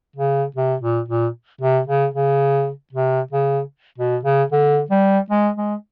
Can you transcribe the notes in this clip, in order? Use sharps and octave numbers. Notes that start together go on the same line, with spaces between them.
C#3
C3
A#2
A#2
C3
C#3
C#3
C3
C#3
B2
C#3
D3
G3
G#3
G#3